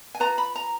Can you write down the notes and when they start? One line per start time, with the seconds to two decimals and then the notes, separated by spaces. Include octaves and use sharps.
0.15 G#5
0.20 F4 B4 A#5
0.38 B5
0.56 A#5